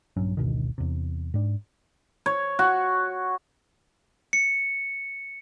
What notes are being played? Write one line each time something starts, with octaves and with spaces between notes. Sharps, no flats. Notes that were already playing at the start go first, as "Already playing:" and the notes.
A#1 G2 F#3 C#4
G#1 D2 B2 D#3
E2 C3
G#2 D4
C#5
F#4
C#7